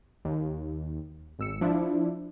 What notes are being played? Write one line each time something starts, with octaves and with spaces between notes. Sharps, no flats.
D#2
G#1 E6 C#7
F3 D4 E4